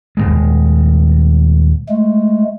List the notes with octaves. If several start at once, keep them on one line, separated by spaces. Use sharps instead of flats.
D#1 C2 G#3
G#3 A3